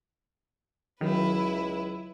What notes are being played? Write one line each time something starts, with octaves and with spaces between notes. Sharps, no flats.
C#2 D#3 F#3 E4 B4